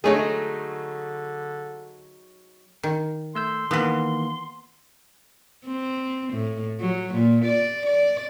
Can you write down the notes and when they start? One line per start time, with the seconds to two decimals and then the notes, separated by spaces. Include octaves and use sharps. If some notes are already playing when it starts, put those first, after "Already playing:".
0.04 D3 F#3 G#3 A3 D#4 G#4 C#5
2.83 D#3
3.35 A3 C6 E6 G6
3.71 D#3 E3 A#3 B3 B4
5.66 C4
6.33 A2
6.80 F#3
7.14 A#2
7.45 D5
7.86 D5